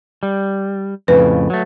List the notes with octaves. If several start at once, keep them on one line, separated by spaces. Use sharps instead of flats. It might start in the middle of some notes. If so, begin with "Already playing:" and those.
G3
F2 A2 C#3 B4
F#3 A3